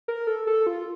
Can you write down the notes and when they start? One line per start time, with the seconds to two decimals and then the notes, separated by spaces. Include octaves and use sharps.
0.08 A#4
0.27 A4
0.47 A4
0.67 F4